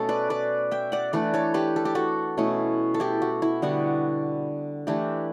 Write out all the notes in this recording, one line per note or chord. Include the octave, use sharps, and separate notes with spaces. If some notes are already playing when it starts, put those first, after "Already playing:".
Already playing: B2 A3 C#4 A4
B4 D5
B4 D5
E5 G5
D5 F#5
E3 A3 D4 B4 D5
A4 C#5
G4 B4
A4
G4
F#4 A4
B2 A3 C#4 E4
A4
E4 G4
F#4
E4
D3 G3 B3 F#4
E3 A3 D4 E4 G4